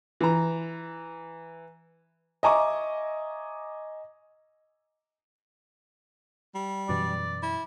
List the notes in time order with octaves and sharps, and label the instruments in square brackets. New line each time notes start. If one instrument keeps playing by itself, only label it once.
[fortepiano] E3 A#5
[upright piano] D#5 E5 G#5 A#5 C#6 D6
[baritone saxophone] G3
[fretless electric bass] F#2 B2 E3 [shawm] D5
[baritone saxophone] E4